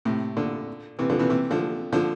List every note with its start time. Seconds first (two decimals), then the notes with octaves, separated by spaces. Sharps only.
0.05 A2 C3
0.37 A#2 D3
0.99 C3 E3
1.09 D3 F3
1.19 C3 E3
1.30 C3 E3
1.51 D3 F3
1.93 D3 F3